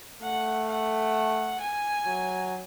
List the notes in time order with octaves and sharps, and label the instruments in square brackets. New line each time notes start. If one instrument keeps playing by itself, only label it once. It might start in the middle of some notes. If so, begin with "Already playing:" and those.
[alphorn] A3 [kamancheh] F#5
[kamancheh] F#5
G#5
[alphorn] F#3